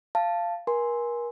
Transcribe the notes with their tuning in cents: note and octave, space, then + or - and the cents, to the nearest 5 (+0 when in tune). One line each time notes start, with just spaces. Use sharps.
F5 -15 A5 +0
A#4 +35 G#5 +0 C6 +0